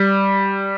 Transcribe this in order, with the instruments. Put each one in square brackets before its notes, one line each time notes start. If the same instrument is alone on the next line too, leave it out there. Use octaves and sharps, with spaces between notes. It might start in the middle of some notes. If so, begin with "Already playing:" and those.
Already playing: [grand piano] G3